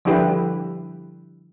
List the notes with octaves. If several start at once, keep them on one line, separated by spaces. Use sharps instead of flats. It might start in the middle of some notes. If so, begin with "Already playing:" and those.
D3 F3 G3 E4 G4 B4